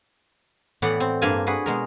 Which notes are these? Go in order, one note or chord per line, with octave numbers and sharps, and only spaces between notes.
A2 E3 B3 D5 F#5
C4
G2 A#3 A#4 G#5 A5
F#4 G#4 B4
B2 G#3 A#4